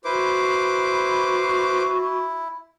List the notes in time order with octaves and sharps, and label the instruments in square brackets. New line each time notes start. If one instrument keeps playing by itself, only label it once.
[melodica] E4 [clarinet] F#4 [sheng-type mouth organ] B4 C5 D6